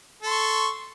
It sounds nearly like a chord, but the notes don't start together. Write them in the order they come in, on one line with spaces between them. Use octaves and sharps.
A4 C6 C#6